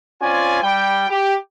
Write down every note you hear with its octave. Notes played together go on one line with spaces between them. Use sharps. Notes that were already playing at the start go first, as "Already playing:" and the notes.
C4 C#4 F4 D5 G#5
G3 G5
G4